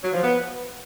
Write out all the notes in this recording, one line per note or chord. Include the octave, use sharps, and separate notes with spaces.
F#3
F3
B3